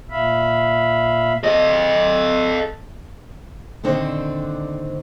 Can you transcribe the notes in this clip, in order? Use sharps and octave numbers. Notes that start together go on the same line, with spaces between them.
A#2 E5 F5 B5
A4 D#5
A#2 D3 D#3 C4 D4 C5